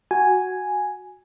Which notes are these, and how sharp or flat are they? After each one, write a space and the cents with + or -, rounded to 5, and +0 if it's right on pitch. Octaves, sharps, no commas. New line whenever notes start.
F#4 +0 G#5 +0